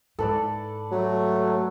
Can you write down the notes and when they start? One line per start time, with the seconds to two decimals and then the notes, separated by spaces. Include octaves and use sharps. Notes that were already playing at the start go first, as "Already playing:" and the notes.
0.19 G#2 A4 B4 D5
0.91 F#3 A3